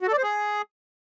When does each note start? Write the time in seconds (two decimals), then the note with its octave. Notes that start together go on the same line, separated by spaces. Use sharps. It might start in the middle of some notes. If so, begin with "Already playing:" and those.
0.02 F#4
0.07 A4
0.13 D5
0.18 C5
0.23 G#4